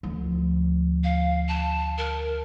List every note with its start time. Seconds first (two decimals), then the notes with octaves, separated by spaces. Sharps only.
0.03 D2 F3
1.04 F5
1.48 A5
1.98 A#4